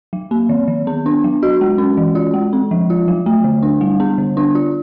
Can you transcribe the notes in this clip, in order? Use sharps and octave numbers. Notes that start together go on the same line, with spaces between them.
F#3
A#3
D#3
D#3
B3
D4
F#3
F#4
G#3
C#4
E3
F4
G#3
C4
F3
F4
F#3
A3
D3
D4
G3
B3
D3
D4
F4